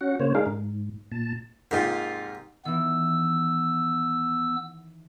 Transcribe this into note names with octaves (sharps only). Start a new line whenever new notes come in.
C#4 F#4 F#5
C#3 A#3 C5 C#5
G#3 D4 D#4 G#4 A#4 F5
G#2
A#2 A5
G#2 C3 A#3 D#4 F4
D#3 E3 B3 E6